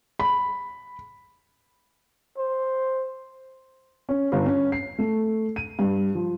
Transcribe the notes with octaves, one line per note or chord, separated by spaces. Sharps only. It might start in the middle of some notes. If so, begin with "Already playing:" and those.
B5
C5
C#4
G1
C#4
C7
A3
D#7
G2
F3